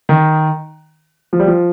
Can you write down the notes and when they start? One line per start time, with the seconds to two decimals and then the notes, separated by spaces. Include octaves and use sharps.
0.09 D#3
1.33 F3
1.40 G3
1.47 F3